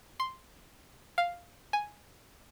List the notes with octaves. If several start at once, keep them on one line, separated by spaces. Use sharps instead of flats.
C6
F5
G#5